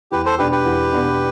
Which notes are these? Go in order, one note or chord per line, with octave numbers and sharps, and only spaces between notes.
E2 G4 B4
A4 C5
B2 B3 D4 G4 B4
G4 B4
E2
B2 B3 D4